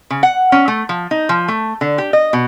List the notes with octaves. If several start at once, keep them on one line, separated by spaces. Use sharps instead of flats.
C#3
F#5
C#4
A3
F3
D#4
F3
A3
D3
G4
D#5
B2